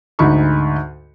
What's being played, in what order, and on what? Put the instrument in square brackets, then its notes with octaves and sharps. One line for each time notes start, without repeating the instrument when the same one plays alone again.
[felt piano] D2 G#2 D#4 B5 C#6